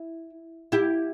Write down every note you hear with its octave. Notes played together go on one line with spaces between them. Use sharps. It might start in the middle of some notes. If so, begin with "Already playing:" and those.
Already playing: E4
E4 G4